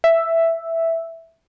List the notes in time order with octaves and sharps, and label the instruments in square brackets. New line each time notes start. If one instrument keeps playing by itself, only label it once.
[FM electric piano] E5